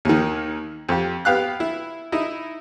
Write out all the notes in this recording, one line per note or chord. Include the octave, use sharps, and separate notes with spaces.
D#2 D#3
F2 G4
B3 G4 F5 F#6
E4
D#4 E4